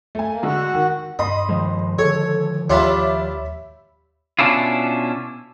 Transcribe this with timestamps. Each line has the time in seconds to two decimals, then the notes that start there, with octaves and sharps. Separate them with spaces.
0.15 A3 G#5
0.30 A#3
0.43 D3 G#3 F#4
0.74 D#3
1.19 G2 D#5 B5 C6 D#6
1.49 D#3 F3 G#3
1.99 D3 A4 C#5
2.70 D#2 D4 F4 G4 C#5 E5 B5
4.39 B2 C#4 D4 E4 F4